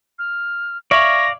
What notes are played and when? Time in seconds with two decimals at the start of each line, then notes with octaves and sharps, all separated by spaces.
0.19 F6
0.91 C#5 D5 E5 F5 B5 A#6